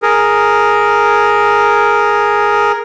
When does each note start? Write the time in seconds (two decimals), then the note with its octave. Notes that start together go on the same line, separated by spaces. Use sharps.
0.02 G#4 A#4